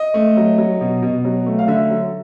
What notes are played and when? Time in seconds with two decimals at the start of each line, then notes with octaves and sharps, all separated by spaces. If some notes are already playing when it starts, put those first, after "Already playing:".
Already playing: D#5
0.14 A3
0.37 F#3
0.58 F#3
0.81 B2
1.02 B2
1.25 F#3
1.46 A3
1.59 F5
1.68 D3 E5
1.90 F#3